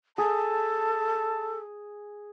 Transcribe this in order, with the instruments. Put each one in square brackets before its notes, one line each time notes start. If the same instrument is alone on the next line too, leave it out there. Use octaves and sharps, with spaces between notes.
[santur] G#4 [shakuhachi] A4 [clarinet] A5